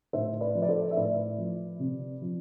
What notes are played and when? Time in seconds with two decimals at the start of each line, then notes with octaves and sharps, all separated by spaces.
0.13 A2 C5 E5
0.41 B4 D5
0.55 F3
0.62 D5
0.69 A4 C5
0.91 E5
0.96 A2 B4 D5
1.38 F3
1.79 C3
2.21 F3